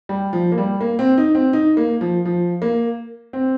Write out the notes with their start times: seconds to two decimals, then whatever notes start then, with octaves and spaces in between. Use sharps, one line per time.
0.09 G3
0.33 F3
0.52 A#3
0.58 G3
0.81 A#3
0.99 C4
1.18 D#4
1.35 C4
1.53 D#4
1.77 A#3
2.01 F3
2.25 F3
2.62 A#3
3.33 C4